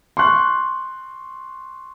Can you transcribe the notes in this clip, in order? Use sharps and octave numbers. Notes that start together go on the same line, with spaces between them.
C6 C#6 F#6